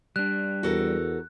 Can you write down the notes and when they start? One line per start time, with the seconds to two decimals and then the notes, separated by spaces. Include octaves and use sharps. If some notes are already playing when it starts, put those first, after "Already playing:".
0.16 G3 D4 F#6
0.63 E2 F#4 A4 A#4